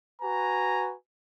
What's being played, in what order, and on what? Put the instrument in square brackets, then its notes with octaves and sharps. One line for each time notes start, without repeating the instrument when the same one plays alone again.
[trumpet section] F#4 B4 G#5 A#5